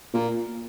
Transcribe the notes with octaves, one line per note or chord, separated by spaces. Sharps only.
A#2